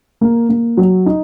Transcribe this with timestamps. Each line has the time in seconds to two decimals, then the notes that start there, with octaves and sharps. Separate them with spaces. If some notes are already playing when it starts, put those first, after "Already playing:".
0.21 A#3
0.49 A#3
0.77 F#3
1.06 D#4